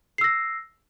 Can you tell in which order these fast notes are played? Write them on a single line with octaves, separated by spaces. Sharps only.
C7 E6 A#6